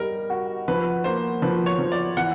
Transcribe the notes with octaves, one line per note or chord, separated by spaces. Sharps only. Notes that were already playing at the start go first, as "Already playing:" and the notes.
Already playing: G3 D#4 A#4
F#4
F3 B4
A#3 C5
F3 B4
C#5
F3
D5
E3 F#5